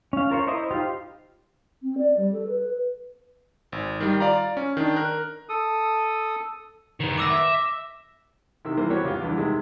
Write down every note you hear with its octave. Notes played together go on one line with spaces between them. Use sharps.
C#4 F5
F4 A#4 C5 C#5
E4 C5 D#5 E5 A#5
D#4 F4 G4 C5 F5
C4
D5
G3
A4
B4
G#1
D#3 G3
F4 D5 F5 A#5
C#4
D#3 D4
A#4 F#6
A4 D#6
D#3 B3
D6 E6 A#6
E5
C3 D#3 E6
E3 G3 A#3 B3 C5
F#3 A#3 B3 F#4 G4 C#5
C#2 F4
E2 G2 D3
C3 D#3 G#3